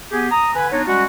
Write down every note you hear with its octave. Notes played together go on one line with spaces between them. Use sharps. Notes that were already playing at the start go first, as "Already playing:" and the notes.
B3 G4 G#4
A#5 D#6
D3 B4 G#5
B3 D4 D#4 F4 F#4 C#5
G3 G#3 C#4 F#4